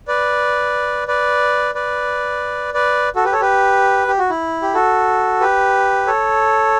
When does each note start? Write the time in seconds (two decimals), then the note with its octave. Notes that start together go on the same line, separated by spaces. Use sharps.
0.08 B4 D5
1.08 B4 D5
1.75 B4 D5
2.74 B4 D5
3.16 F#4 A4
3.24 G4 B4
3.32 A4 C#5
3.41 G4 B4
4.08 G4
4.19 F#4
4.30 E4
4.62 G4
4.74 F#4 A4
5.40 G4 B4
6.07 A4 C#5